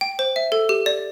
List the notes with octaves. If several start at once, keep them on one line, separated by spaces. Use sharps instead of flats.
G5
C5
E5
A4
G4
D5